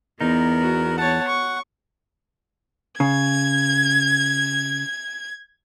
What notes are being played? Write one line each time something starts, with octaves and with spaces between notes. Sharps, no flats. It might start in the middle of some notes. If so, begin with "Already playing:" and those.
E2 B3 D#4 A#4
F#4
C#5 F#5 A5
C#6
C#3 G#6